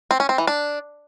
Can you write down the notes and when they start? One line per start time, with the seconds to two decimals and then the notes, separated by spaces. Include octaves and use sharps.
0.11 C4
0.20 C#4
0.29 C4
0.38 E3
0.47 D4